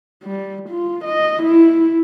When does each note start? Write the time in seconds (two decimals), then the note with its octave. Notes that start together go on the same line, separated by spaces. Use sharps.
0.24 G3
0.70 F4
1.05 D#5
1.43 E4